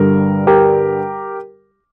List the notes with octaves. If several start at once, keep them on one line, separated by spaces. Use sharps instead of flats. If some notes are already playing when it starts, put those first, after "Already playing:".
Already playing: G2 D3 G3 A#4
G4 A#4